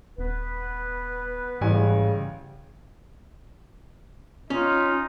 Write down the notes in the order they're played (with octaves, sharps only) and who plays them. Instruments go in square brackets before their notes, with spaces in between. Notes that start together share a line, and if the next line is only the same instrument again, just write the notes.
[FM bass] D#1 [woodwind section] B3 B4
[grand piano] A1 G3 G#5 [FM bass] G#2 [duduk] C#3
[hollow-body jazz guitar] C#4 [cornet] D#4 [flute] F4